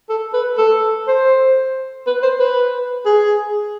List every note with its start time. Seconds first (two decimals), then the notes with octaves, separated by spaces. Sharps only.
0.10 A4
0.34 B4
0.58 A4
1.08 C5
2.07 B4
2.23 C5
2.40 B4
3.06 G#4